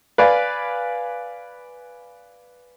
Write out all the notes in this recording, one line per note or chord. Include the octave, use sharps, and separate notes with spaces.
B4 D5 F5 G#5